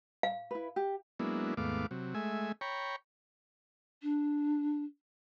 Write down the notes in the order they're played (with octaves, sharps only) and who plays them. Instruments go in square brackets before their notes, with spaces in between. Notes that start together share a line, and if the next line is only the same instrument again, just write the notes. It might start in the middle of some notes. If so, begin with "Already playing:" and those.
[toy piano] F5
[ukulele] E4 B4
G4
[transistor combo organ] F#3 G#3 A#3 B3 D4 E4
D#2 G#2 A3 B3 F5 D6
C3 F#3
G#3 A3 E5 G#5
C#5 G5 A#5 B5 C#6
[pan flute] D4